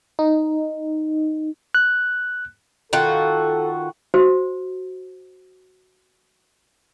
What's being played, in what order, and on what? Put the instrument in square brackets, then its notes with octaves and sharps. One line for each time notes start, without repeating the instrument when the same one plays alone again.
[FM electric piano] D#4
[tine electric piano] F#6
[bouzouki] D#3 F4 F#4 [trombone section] A4
[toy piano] F#4 C5